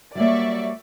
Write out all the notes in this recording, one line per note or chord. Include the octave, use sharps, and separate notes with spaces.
F#3 G3 A#3 D5 E5 C#6